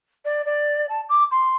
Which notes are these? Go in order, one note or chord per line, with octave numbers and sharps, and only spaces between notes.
D5
D5
A5
D6
C6